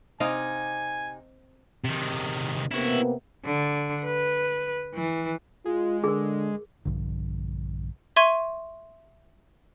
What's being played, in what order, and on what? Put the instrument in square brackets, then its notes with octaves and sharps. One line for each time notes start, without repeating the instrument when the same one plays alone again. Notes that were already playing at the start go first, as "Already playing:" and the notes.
[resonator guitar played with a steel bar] C3 D#4 [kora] C4 D#5 F5 [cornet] G#5
[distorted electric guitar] C3 D#3
[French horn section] C3 A#3 B3 [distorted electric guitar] E4 F#4
[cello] D3
B4
E3
[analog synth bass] G#3 [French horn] F4
[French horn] D3 [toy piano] G#4 A#4
[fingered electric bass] A#1 G2 D3
[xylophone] E5 C6 C#6 G#6 D#7 G7